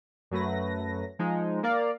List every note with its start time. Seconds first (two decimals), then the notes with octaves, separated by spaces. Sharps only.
0.31 F#2 F#3 A3 B4 A#6
1.19 F3 G#3 D#4
1.63 A#3 A#4 D5 F5